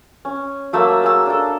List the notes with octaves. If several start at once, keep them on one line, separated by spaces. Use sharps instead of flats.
C#4
F#3 A3 A#3 E6
G#4 E6
D4 A4